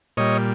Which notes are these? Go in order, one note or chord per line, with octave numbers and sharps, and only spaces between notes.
A#2 G3 C#5 D#5